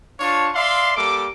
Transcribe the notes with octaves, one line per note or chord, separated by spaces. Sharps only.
D4 F4 C#5 F5 A5 C#6
D5 E5 F5 C6
G3 A#3 A4 D6